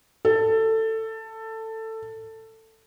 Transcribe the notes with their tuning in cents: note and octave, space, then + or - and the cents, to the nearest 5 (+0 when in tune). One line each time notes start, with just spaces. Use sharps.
A4 +15